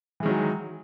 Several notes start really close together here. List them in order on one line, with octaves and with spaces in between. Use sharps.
E3 G#3 D#3 F#3